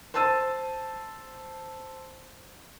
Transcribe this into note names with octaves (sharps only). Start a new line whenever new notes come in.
C5 A5 E6 A6 D#7